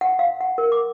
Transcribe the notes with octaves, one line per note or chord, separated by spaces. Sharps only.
F#5
F5
F#5
A#4
D6